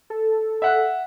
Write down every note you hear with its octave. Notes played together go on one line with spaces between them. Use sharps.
A4
E5 F#5 F#6